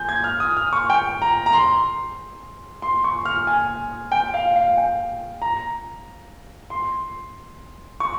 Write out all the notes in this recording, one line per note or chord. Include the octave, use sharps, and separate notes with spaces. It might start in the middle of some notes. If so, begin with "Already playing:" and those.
Already playing: G#5 G6
G#6
F6
D#6
F6
C#6
G5
A#5
A#5
C6
C6
C#6
F6
G#5
G5
F5
F5
G5
A#5
C6
C#6